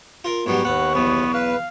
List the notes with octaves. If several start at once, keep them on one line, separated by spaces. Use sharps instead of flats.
F4 A#4
G#2 F#3 G3 B3 C#6
D#2 B3 F#5
B1 E2 B3
B4 F5